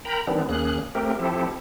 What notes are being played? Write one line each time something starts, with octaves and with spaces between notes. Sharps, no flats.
A#4 G5 A#5 B5
D#3 E3 G3 B3 C4 D4
D#2 A#3 C#4 G#4 F#6
A3 C4 G4 A#4
F3 C4 E4 G4 A4